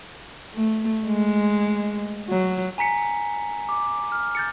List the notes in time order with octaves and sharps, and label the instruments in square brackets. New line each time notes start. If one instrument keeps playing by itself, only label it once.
[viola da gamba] A3
G#3
F#3
[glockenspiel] G#5 A#5 B6 C#7
D6
F6
G6 A6 C#7